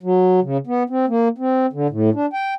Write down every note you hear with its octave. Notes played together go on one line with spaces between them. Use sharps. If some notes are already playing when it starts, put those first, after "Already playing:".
F#3
C#3
B3
C4
A#3
C4
D3
A2
D4
G5